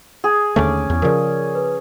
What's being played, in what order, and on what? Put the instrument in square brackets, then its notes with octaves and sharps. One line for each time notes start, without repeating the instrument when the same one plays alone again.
[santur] G#4
[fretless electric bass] D#2 D3 A3 [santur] C#4 D6
[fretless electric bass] E2
[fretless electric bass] C#3 F3 [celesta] A#4 D5
[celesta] B4